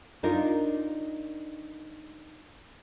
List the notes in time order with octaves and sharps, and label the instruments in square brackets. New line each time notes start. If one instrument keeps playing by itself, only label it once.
[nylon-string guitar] D4 D#4 F4 A#4